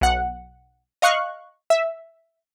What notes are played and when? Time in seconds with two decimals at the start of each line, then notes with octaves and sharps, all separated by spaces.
0.01 B1 F#5
1.02 D#5 F5 C#6 F#6
1.70 E5